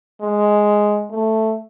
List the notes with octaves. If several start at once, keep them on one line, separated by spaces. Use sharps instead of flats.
G#3
A3